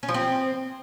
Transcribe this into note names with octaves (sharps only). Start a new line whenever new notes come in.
C#4
F3
C4